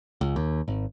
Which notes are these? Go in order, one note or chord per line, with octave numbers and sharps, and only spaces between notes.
C#2
D#2
G#1